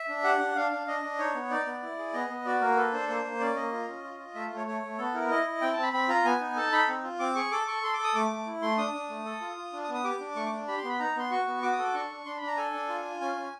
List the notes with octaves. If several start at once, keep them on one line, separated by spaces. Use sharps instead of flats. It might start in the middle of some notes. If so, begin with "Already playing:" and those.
Already playing: E5
D4
G4 F#5
D4
D4 F5
D4
D4 D#5
D4
D#4 C#5
B3
D#4 D5
B3
E4
G#4
B3 D#5
B3
F#4 D5
A#3 A#4
A4 B4
D4 C5
A#3 C5
A#3
C#4 D5
A#3 D#5
F4
C#4
F4
F4
A3 E5
A3
C#5
A3 C#5
A3
B3 A4
E4 A#4
E4 D#5
E4
C4 G5
A5
C4
B5
C4 B5
F4 A#5
B3 G#5
D#4
A4 A5
D#4 B5
C4
F4
C4 D6
G#4 C#6
A4 D6
A4 C#6
A4 C6
D6
A4
D#6
A3 D6
A3
E4
A3 C6
D4 D#6
D4
A3
A4
F4
F4
D4
D#6
B3
D#6
G4 D6
D4
A3 C#6
D6
D4
G4 B5
C6
B3 B5
D#4 A#5
B3 C6
F#4 C#6
B3
F#4 D6
D#6
A4 D6
D4 C#6
D4
D4 C6
B5
D4
A#5
A4 G#5
D4
F4
F4
C#4 G#5
C#4